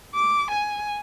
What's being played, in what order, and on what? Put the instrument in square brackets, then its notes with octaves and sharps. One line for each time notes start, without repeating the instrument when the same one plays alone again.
[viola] D6
G#5